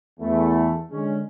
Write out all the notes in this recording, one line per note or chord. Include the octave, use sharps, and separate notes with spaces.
E2 A3
D3 G#3 C#4